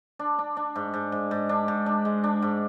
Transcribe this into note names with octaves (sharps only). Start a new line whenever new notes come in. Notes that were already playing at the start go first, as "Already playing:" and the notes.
D4
D4
D4
G#2
G#2
G#2
G#2
D4
G#2
D4
G#3
D4
G#2